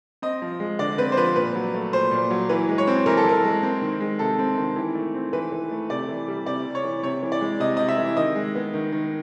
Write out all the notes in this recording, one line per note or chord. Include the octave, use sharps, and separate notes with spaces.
C4 D#5
F3
G#3
D3 D5
C4 B4
C5
F3 B4
A#2 B4
F#3
A3
A#2 C5
A#2
F#3
E3 B4
G#3
C#5
C4
E3 A#4
A4
E3 A#4
G#3
C4
D#3
G#3
C3 A4
C4
D#3
E3
A3
C4
E3 B4
E3
A3
C3 D5
E3
G3
C3 D5
C3
C#5
E3
C3 C#5
E3
D5
G#3
C3 D#5
C3 D#5
E5
E3
D#3 D#5
G#3
B3
D#3
D#3